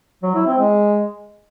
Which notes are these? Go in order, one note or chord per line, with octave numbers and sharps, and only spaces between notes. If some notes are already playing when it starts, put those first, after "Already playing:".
F#3
E4
C4
G#3